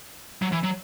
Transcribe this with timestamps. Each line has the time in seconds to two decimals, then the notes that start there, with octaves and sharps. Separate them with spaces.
0.42 F#3
0.52 E3
0.63 F#3